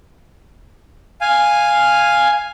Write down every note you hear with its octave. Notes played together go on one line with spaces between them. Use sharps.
F5 G#5